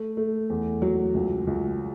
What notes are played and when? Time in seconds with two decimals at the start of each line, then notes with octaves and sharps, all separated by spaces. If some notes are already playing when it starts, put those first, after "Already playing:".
Already playing: A3
0.17 A3
0.50 E2
0.82 F#3
1.14 C#2
1.47 C#2